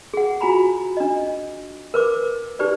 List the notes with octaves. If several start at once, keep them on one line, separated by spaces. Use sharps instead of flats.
G#4 F#5
F4 F#4 G#5 A#5 B5
D4 D#5
A#4 B4 D6
D#4 G4 B4 D5